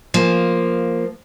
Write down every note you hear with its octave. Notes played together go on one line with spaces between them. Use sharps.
F3 A#3